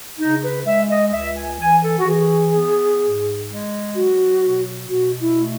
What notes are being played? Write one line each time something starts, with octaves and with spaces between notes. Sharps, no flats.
C#3 D#4
B4
G#3 E5
D#5
C#2 E5
G#5
E3 G#5
A4
F#4
E3 G#4
B3
G#2
G#3
F#3 F#4
B2
B2 F#4
E4
A3